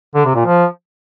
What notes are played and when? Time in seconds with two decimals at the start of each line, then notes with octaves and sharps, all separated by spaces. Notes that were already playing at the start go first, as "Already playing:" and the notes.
0.15 D3
0.25 C3
0.35 A#2
0.45 F3